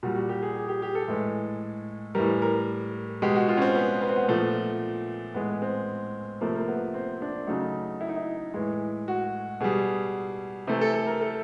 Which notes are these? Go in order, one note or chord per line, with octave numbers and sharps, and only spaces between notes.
A#2 G3 F#4
F#4
G4
G#4
G#4
G4
G4
A4
A2 E3 G#3
A2 E3 G3 A#4
A#4
B2 G#3 G4
F#4
F4
C#4
C4
B3
B3
C4
B3
A#2 F3 A3
A2 E3 G#3 B3
C4
C3 F3 A3 A#3
A#3
B3
C4
D4
C#3 F#3 A3 D#4
E4
D#4
E4
A2 E3 G#3
F#4
B2 G3 G#4
C3 E3 A3
A4
A4
A#4
A4